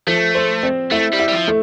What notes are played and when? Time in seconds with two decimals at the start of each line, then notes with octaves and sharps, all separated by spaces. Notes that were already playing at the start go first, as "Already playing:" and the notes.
0.07 F3 A3
0.35 C5
0.63 C4
0.91 A3 E4
1.13 G3
1.19 E4
1.28 G3
1.34 F3
1.48 A3